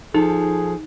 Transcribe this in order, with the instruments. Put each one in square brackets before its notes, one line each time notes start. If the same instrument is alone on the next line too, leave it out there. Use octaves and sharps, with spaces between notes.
[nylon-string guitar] F3 A4 [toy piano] D#4 [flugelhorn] G#4